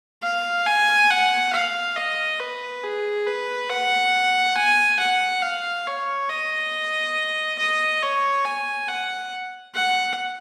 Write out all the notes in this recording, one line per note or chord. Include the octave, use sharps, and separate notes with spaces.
F5
G#5
F#5
F5
D#5
B4
G#4
B4
F#5
G#5
F#5
F5
C#5
D#5
D#5
C#5
G#5
F#5
F#5